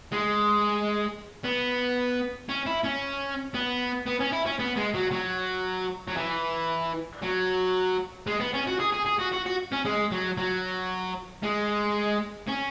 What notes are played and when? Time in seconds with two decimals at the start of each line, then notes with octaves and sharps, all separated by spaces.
0.12 G#3
1.44 B3
2.49 C#4
2.66 E4
2.84 C#4
3.54 B3
4.07 B3
4.20 C#4
4.32 E4
4.46 C#4
4.59 B3
4.76 G#3
4.94 F#3
5.11 F#3
6.08 F#3
6.17 E3
7.22 F#3
8.27 G#3
8.40 B3
8.54 C#4
8.67 F#4
8.80 G#4
8.93 G#4
9.06 G#4
9.19 F#4
9.33 F#4
9.46 F#4
9.72 C#4
9.85 G#3
10.11 F#3
10.38 F#3
11.43 G#3
12.48 C#4